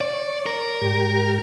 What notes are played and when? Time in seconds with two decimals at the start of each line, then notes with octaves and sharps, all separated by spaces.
0.01 C#5 D5
0.46 A#4
0.81 G#2 G4